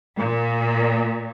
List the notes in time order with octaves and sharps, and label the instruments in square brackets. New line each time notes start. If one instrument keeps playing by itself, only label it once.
[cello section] A#2